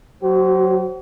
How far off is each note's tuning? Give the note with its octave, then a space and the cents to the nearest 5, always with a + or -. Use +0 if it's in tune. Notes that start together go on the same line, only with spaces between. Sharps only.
F#3 +0 F#4 +40 C5 +0